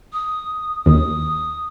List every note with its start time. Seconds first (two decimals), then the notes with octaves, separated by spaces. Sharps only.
0.13 D#6
0.86 D#2 D#6